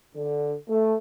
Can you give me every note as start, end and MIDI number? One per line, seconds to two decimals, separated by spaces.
0.16 0.54 50
0.69 0.94 57